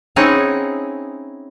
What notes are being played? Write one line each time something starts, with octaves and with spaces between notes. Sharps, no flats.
C4 C#4 D#4 E4 G#4 F#5